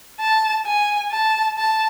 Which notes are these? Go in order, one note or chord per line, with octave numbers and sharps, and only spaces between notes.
A5
G#5
A5
A5